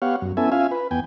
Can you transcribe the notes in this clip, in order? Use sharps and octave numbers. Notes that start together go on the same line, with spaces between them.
B3 G4 C#5 F5 F#5
F#2
B3 C#4 E4 A4 E5 G#5
C#4 F4 E5 F5 G#5
B4
E2 B3 G5 G#5